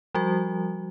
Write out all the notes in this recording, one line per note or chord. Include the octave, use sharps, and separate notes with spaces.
F3 G3 F#4